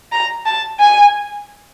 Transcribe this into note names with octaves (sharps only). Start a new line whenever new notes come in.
A#5
A5
G#5